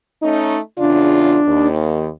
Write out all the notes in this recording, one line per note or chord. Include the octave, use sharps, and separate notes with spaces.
A3 C#4 D#4
E2 C#3 D4 F4
D#2